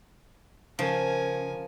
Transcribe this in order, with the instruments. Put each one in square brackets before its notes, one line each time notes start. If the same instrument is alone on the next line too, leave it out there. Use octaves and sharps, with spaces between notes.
[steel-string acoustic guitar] C#3 [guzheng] F3 [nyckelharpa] A#4 G#5